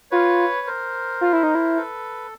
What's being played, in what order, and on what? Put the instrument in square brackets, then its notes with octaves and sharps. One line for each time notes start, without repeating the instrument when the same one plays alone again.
[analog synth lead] F4 [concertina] B4 C#5
[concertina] A#4 C5
[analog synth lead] F4
E4
D#4
E4
[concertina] A4 B4